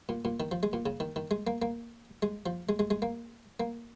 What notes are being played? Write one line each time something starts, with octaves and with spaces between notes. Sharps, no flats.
A#2
A#2
D#3
F3
G#3
A#2
C#3
D#3
D#3
G#3
A#3
A#3
G#3
F3
G#3
G#3
G#3
A#3
A#3